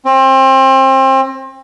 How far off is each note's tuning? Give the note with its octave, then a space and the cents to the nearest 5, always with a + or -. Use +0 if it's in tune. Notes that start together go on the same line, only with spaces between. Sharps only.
C4 +30